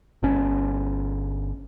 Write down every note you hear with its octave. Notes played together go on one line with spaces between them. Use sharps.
G1 C#4